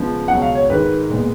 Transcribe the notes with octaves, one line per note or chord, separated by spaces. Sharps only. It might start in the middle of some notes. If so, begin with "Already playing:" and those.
Already playing: C#3 F3 G#3 B3
C#2 B2 F#3 F#5
F5
C#5
G#2 D#3 G#3 B4
A#2 G#3 B3